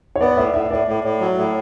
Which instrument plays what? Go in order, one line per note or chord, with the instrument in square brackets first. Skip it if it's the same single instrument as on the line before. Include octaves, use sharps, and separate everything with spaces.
[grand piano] C#5
[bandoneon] B3 [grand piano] D5
[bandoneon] A2 [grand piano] E5
[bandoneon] A2 [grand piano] E5
[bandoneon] A2 [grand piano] D5
[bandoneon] A2
A2
F#3
A2